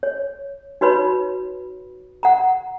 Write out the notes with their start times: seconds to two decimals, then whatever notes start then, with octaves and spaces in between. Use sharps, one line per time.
0.03 C#5
0.81 D#4 F#4 B4 C#5 B5
2.23 F#5 A#5